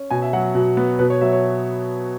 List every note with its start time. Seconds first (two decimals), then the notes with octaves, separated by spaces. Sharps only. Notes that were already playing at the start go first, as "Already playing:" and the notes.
Already playing: C#4
0.11 B2 G#5
0.22 E5
0.33 F#3 F#5
0.55 B2
0.77 B3
0.99 B2 B4
1.10 C#5
1.21 F#3 E5
1.33 C#5